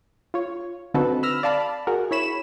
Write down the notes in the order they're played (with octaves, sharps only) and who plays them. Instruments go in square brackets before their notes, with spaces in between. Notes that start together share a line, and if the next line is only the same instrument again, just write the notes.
[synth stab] F4 C#5
D3 C4 D#4 F#4 A4 B4
B5 E6 F6 A#6
D5 F5 A5 B5
F#4 G#4 A#4
E4 C#5 B5 E7